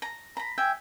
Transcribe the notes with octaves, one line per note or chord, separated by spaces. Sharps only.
A#5
A#5 B5
E5 G5 G#5